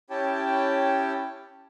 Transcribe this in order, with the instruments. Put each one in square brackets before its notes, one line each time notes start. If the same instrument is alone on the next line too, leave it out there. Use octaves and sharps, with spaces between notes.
[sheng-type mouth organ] C#4 E4 G4 C#5 G5 A5